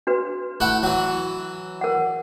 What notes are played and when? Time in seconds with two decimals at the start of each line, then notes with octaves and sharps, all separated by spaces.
0.07 D4 F#4 B4
0.60 A3 E4 F#5
0.83 E3 F#3
1.81 A#4 F#5